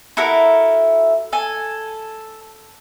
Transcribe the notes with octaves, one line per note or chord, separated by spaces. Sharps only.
E4 F#4 A4 A#4
A4 G#5